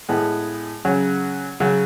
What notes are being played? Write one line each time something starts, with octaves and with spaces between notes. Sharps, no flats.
A2 G#3 B3
C#3 F#3 C#4
C#3 F#3 C#4